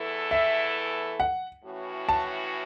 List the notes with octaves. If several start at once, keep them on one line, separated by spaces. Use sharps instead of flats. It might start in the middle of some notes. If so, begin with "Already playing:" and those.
Already playing: E2 E3 A3 E4 A4
E5
F#5
A2 E3 C#4 F#4
A5